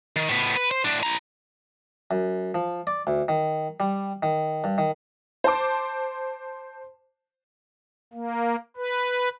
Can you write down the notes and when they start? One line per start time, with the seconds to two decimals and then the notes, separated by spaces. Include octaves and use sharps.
0.16 D#3
0.29 A2 B3
0.56 B4
0.71 C5
0.84 A2 D4
1.03 E4 A#5
2.11 F#2
2.55 F3
2.87 D5
3.07 D2
3.28 D#3
3.80 G3
4.23 D#3
4.64 G2
4.78 D#3
5.44 C5 A5 D6
8.13 A#3
8.76 B4